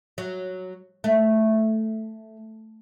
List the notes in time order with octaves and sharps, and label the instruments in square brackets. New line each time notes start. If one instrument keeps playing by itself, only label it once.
[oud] F#3
A3